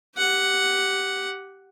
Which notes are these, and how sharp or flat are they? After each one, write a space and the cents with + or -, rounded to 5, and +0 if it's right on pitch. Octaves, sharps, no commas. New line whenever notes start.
G4 -10 F#5 +0